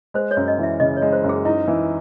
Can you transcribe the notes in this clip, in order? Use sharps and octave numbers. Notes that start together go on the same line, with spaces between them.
G#3 C5
C#5
F#2
D#5
E3 E5
C#3 D#5
C#5
G#3
C5
F#2
G#4
D#4 E4
E3